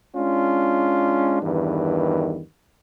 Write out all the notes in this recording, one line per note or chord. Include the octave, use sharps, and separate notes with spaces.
G#3 C#4 D4 F4
E2 G2 D#3